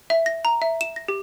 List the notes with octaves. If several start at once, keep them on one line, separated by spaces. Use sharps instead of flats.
E5
A#6
A#5
E5
E7
A#6
G4